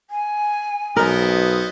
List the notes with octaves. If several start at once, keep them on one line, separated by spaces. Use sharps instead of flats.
G#5
B1 B3 C4 A#4 D#5